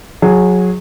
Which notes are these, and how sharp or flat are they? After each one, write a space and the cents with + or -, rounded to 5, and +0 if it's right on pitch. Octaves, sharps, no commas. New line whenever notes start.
F#3 -20 G#4 +0